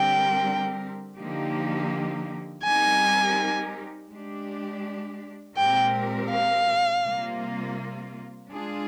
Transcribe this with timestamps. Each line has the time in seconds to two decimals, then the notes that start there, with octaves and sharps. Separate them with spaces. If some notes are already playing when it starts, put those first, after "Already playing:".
Already playing: D3 G3 C4 G4 A#4 G5
1.17 D3 F3 A#3 D#4 G4
2.64 G3 C4 D#4 G4 A#4 G#5
4.10 G#3 D4 G4
5.56 A#2 G#3 C4 G4 A#4 G5
6.31 F5
7.03 C3 G3 A#3 F4
8.50 G#3 D4 F4 G#4